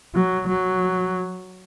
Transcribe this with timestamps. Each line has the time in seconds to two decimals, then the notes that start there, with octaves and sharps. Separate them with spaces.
0.15 F#3
0.48 F#3